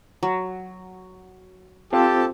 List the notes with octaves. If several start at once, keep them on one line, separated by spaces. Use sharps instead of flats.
F#3
C4 F4 G4 A4 C5 A5